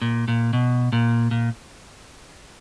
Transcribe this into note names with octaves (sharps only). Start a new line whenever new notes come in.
A#2
A#2
B2
A#2
A#2